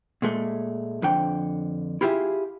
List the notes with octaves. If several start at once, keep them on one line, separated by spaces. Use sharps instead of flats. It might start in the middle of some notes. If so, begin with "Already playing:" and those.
A#2 G#3 A3
F2 D3 G5
E4 F4 G4 G#4 E5